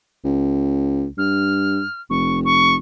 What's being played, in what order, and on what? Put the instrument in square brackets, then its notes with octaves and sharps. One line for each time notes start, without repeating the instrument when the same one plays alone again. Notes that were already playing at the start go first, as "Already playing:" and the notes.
[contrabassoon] C#2
[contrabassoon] G2 [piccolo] F6
[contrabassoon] F1 [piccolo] C#6
[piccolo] C#6